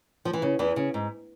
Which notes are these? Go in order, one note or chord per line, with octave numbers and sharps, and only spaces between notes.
F3
E3
C#3
E2 E3
C#3
G#2